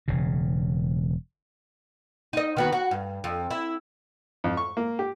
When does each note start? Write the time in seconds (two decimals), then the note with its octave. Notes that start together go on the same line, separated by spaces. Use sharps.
0.08 E1 C#3
2.33 D#4 D#5
2.57 D#3 B3 F#4
2.73 F#4
2.91 G2
3.24 F2
3.50 E4
4.44 F2
4.57 C#6
4.77 A#3
4.99 G4